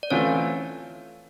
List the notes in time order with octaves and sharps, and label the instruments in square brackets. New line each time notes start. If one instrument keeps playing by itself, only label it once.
[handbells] D5
[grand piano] E3 A3 C4 F4 [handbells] C#4 C#5